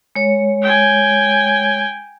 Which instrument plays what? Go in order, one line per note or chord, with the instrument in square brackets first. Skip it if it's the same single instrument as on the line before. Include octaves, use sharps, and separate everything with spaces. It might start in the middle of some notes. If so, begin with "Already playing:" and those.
[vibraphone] G#3 C#5
[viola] G5 G#5